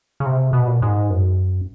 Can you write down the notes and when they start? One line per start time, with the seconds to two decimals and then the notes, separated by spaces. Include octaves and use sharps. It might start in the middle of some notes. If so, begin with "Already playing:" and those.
0.20 C#3
0.26 C3
0.53 B2
0.67 A#2
0.82 G#2
1.10 F#2